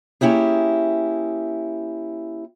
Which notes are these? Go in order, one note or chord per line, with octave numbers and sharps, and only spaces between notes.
A#3 C#4 E4 G4 G#4